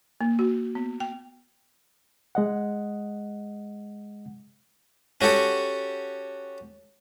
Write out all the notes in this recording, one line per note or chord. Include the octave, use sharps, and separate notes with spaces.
A#3
F#4
B3
G5
G#3 D#5 F#5
C#4 F#4 G4 A4 F#5